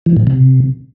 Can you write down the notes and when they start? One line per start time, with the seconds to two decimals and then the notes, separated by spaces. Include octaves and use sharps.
0.06 E3
0.17 A2
0.27 C3